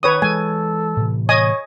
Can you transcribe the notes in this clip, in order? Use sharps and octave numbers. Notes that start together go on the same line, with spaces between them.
D#3 B4 C#5 D#6
E3 G#3 A4 G#5
A2 C3 E3
C#5 D#5 G#5 D#6